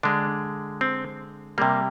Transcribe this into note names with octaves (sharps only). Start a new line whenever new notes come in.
D3 G#3 D4
C4
C3 G3 A#3